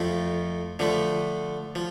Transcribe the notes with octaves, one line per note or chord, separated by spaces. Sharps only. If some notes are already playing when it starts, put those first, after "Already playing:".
Already playing: F2 F3 A3 F4
D3 F3 A3
F3